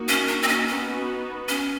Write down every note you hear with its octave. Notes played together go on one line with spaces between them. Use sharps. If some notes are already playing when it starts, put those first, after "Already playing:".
Already playing: A#3 D#4 F#4
C#4
D4
C4
C#4
B3 C#4 D#4 F#4 B4
C#4